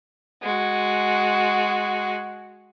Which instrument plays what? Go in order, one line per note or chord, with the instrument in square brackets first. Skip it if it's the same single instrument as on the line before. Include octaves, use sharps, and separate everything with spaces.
[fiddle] G#3 F#4